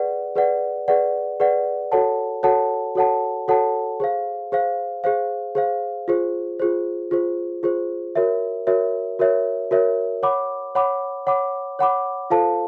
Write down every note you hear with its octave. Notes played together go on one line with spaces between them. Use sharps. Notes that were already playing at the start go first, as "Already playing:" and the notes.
Already playing: G#4 B4 D5 F#5
G#4 B4 D5 F#5
G#4 B4 D5 F#5
G#4 B4 D5 F#5
F#4 A4 C#5 F#5 A5
F#4 A4 C#5 F#5 A5
F#4 A4 C#5 F#5 A5
F#4 A4 C#5 F#5 A5
G#4 C5 F5
G#4 C5 F5
G#4 C5 F5
G#4 C5 F5
F4 G#4 C5
F4 G#4 C5
F4 G#4 C5
F4 G#4 C5
F#4 A#4 C#5 E5
F#4 A#4 C#5 E5
F#4 A#4 C#5 E5
F#4 A#4 C#5 E5
C#5 F#5 B5 D6
C#5 F#5 B5 D6
C#5 F#5 B5 D6
C#5 F#5 B5 D6
F4 A4 C5 F5 A5